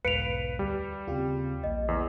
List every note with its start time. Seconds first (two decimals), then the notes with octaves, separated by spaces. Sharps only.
0.05 B1 E2 G#2 B4 F5 C#7 D7 F7
0.59 D2 G3
1.07 D#2 C#3 C4 F4 G4
1.64 A#1 A#3 D#5
1.88 E2